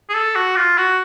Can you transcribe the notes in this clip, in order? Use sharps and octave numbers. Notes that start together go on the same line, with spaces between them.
G#4
A4
F#4
F4
F#4